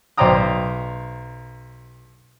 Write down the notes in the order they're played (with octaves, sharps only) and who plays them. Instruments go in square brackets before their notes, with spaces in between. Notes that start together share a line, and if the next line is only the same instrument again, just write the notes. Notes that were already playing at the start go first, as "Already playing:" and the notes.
[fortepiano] B1 C5 D5 G5 A#5 D#6